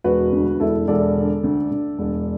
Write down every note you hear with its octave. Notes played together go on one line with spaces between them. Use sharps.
E1 F#4 B4
D2
E1 E4 A4
E1 A4 D5
D3
D2
D2
E1